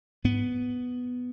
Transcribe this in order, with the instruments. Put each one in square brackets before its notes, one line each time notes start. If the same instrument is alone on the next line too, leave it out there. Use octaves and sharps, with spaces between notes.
[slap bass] G#2 B3